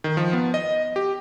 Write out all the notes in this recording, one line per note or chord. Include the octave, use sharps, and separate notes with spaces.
D#3
F3
B3
D#5
G4